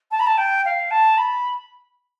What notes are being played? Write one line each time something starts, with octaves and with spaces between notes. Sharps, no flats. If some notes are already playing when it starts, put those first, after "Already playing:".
A5
B5
A5
G5
F5
A5
B5